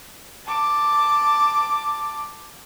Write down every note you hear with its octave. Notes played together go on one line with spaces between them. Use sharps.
A5 D6